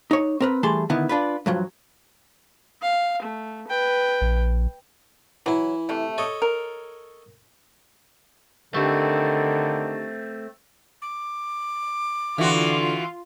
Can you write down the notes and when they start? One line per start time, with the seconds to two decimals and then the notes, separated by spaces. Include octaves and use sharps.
0.11 D#4 C#5
0.40 C4 A#4 B4
0.63 E3 G3 A3 G#4 A5 C6
0.90 D3 D#3 B3 E4
1.09 D4 F4 B4
1.46 G2 F3 F#3
2.82 F5
3.22 A3
3.67 B4 G5
4.21 A#1
5.46 E3 F#3 E4
5.89 C3 A3
6.18 A4 C#5 D#5
6.42 A#4
8.74 D3 D#3 A3 C4 D4 G4 C#6
11.02 D6
12.38 D3 E3 F4 F#4